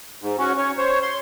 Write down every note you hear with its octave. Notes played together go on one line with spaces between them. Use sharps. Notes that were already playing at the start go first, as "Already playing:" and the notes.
G#2
C#4 F#4
C#4 C#5
C5 C#5
C6